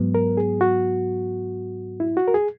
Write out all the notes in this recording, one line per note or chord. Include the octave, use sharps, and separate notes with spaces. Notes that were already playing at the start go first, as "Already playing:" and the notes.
Already playing: G#2 F#3 B3
A#4
G#4
F#4
E4
F#4
A#4
G#4